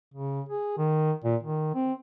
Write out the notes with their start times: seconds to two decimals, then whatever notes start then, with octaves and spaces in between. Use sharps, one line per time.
0.14 C#3
0.49 G#4
0.78 D#3
1.24 A#2
1.43 D#3
1.75 C4